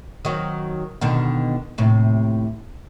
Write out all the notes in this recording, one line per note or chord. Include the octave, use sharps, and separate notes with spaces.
D#3 F#3 C4
B2 D3 D#3
D#2 A2 C3